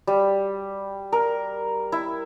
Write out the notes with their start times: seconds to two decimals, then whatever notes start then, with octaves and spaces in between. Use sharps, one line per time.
0.07 G3
1.12 A#4
1.92 E4